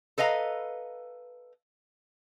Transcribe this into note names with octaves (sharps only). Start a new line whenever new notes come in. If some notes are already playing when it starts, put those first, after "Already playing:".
A4 B4 D#5 F5 A#5